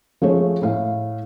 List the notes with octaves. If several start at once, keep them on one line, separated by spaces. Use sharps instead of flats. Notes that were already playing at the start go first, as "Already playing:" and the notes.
F3 A3 G#4 C#5
A2 F5